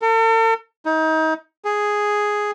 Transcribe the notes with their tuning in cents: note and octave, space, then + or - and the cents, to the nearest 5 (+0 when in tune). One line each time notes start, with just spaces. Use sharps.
A4 +45
D#4 +30
G#4 +0